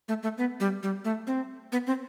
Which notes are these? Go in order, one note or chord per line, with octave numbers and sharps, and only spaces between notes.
A3
A3
B3
G3
G3
A3
C4
B3
C4